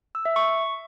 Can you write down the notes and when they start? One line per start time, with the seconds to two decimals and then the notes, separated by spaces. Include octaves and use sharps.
0.15 E6
0.25 E5
0.36 C#6